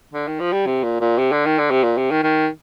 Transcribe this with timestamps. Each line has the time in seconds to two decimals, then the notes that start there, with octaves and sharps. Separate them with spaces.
0.13 D3
0.27 D#3
0.40 F3
0.52 G3
0.66 C3
0.83 A#2
1.01 A#2
1.18 C3
1.32 D3
1.45 D#3
1.59 D3
1.71 C3
1.84 A#2
1.97 C3
2.11 D#3
2.23 D#3